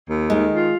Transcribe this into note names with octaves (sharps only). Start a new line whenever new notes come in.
D#2
D#3 G#3
F4